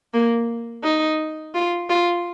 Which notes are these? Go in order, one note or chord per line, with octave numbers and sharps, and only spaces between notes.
A#3
D#4
F4
F4